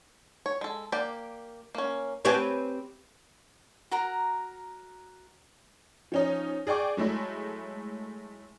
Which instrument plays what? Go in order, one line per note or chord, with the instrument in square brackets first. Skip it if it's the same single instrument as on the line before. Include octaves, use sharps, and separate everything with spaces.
[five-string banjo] C#5
G#3 A4
A#3 G4 D5
A#3 C#4
[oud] C4 G4 B4 [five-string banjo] C#5 G#5 A5
[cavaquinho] F#4 A#4 A#5
[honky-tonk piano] F3 C#4 D#4
G#4 D5 G5 C#6 D6
F#3 G#3 A3 E4